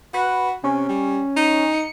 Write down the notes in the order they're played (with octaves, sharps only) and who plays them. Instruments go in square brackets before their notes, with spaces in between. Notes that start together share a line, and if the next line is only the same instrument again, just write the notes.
[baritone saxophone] F#4 [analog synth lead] B4
[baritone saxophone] C3 [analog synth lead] C#4
[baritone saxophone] G3
D#4
[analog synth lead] C#7